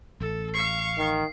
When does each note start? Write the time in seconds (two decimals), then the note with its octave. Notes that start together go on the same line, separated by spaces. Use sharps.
0.20 A1 A4
0.54 F5 C#6 C7
0.98 D#3